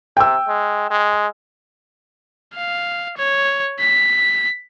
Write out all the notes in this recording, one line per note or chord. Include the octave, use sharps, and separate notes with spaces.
C3 G5 E6
G#3
G#3
F5
C#5
B6